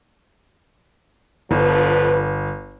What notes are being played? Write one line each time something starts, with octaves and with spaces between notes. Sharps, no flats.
G1 D3 F3 B4